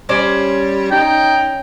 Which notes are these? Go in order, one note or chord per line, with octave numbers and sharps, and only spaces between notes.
G3 C#4 C5 D5
D#4 G5